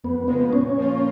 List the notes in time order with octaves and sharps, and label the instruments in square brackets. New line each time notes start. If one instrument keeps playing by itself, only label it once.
[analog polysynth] F2 [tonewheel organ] B3
[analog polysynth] C#3 F3 G#3 [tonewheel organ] B3
[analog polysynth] A#2 [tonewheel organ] C#4
[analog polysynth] F3 A#3 F4